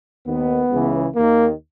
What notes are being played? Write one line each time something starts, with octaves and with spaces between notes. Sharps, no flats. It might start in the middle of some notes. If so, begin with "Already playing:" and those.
D#2 D#3 B3
C#2 C#3 E3
D#2 D#3 A#3